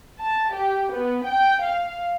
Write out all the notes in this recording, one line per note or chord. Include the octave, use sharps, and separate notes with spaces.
A5
G4
B3
G5
F5